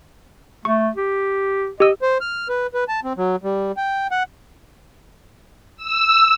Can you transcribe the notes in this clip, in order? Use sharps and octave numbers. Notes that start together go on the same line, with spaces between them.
A3 C#6
G4
G4 D#5 E6
C5
F6
B4
B4
A5
C4
F#3
G3
G5
F#5
E6